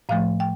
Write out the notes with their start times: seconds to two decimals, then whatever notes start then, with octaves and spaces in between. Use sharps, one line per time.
0.09 A2 F3 A3 F5
0.40 G5